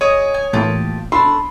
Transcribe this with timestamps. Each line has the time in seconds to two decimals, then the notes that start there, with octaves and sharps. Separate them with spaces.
0.01 G#4 C#5 D#5 D#6
0.34 G#5
0.53 A2 E3 A#3 F4 G4 A5
1.12 A3 D4 B5 C6